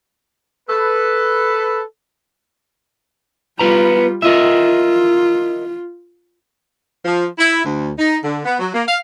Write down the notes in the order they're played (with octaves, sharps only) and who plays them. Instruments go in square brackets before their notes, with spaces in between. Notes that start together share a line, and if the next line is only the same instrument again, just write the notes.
[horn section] A4 B4
[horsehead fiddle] G3 F4 [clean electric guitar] B3 B4 A#5
[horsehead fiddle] F4 [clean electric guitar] A#4 D#5 E5
[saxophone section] F3
E4
D2
D#4
D3
B3
F#3
A#3
F5